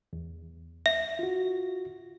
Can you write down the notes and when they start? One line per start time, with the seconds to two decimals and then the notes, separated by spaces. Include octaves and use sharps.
0.13 E2
0.86 E5
1.19 F4 F#4